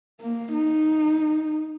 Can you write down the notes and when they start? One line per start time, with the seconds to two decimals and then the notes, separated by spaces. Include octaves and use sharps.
0.20 A#3
0.53 D#4